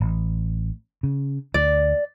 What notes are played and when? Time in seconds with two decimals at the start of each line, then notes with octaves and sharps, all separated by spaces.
0.01 A1
1.03 C#3
1.54 D2 D5